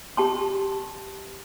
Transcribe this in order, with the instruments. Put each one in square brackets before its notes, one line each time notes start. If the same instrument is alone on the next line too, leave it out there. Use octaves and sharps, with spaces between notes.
[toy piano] G4 A5 C6